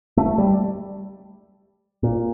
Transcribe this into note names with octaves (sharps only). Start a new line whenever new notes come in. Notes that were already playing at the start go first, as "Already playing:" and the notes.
A3
G3
A#2